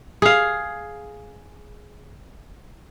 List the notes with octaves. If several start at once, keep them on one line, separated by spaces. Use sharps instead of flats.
G#4 F5